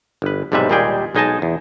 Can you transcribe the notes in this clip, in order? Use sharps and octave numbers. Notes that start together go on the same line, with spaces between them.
G1 B4
B1 G#2 C3 G3 B4 E5
D#2 A#2 G3 G#3 G#4 G5
B1 G#3 D#4 D#5 G#5 A5
E2